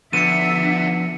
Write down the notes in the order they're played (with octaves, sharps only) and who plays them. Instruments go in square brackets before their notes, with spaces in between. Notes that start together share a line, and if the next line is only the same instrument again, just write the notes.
[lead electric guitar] D3 [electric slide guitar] F3 B3 B4 [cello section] E5 [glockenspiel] C#7 D#7